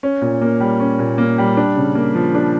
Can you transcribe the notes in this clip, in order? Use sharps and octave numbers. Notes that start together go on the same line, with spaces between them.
C#4
A#2
A#3
G3
C#4
A#2
A#3
G3
D4
C#3
A#3
F3
D4